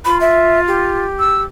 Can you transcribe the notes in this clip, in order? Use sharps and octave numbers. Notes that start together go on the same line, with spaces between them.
F4 B5
E5
G4
E6